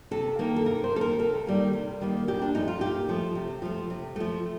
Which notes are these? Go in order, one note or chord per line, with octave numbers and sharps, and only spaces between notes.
C3 A4
D#3 A#3
A4
C3 A#4
C5
D#3 A#3 A4
A#4
C3 A4
D#3 G3 A#3
C3
D#3 G3 A#3
A#2 G4
D4
F3 A3 D#4
F4
A#2 G4
F3 A3
C3
F3 A3
C3
F3 A3